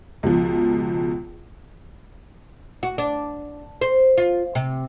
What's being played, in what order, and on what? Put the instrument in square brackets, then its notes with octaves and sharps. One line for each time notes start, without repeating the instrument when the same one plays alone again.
[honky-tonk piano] C#2 B2 F3
[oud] F#4
D4
C5
F4
C3